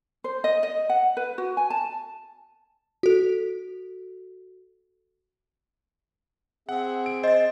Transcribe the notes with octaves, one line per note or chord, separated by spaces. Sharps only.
C5
D#5
D#5
F#5
B4
F#4
G#5
A5
F#4 A4
C4 G#4 E5 F#5
D7
C5 D#5 A6